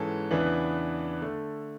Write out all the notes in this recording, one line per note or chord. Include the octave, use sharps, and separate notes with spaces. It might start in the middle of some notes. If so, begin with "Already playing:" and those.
Already playing: G#2 E3 G#3 C#4 A4
E2 C#3 E3 B3 D4
D3 A3